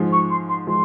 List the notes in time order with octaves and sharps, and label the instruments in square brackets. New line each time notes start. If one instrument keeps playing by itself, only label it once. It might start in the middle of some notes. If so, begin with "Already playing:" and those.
Already playing: [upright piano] G#2 F3 G#3
[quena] C#6
C6
C6
[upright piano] F3 G#3 [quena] C6